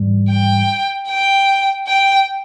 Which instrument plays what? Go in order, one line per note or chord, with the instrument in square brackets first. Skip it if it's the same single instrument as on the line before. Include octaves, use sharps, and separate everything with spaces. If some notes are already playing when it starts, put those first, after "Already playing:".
Already playing: [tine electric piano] G#2 E3 G3
[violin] G5
G5
G5